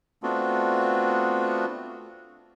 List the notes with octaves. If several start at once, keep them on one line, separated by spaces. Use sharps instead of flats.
A3 B3 C4 D4 F4 F#4